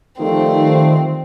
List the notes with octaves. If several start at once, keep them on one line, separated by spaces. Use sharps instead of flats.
D#3 F3 G3 A3 C4